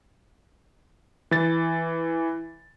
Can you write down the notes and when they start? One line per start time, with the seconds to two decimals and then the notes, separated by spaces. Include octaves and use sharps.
1.31 E3 A6